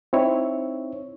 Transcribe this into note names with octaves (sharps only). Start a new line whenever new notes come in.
C4 D#4 E4 C#5